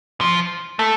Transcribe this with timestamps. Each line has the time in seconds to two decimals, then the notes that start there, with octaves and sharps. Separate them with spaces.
0.21 F3
0.79 A3